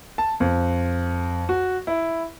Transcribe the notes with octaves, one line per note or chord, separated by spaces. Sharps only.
A5
F2
F#4
E4